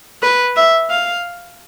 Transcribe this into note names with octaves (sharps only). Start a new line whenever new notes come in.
B4
E5
F5